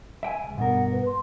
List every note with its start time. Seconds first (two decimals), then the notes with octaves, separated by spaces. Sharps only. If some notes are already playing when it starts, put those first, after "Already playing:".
0.23 E5 G5 G#5
0.44 C#2
0.57 G2 B2 A#4 F#5
0.91 B4
1.06 C6